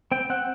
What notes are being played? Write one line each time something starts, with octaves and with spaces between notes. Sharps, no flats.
C4 G5
C4 F#5